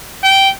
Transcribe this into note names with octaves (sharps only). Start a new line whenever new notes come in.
G5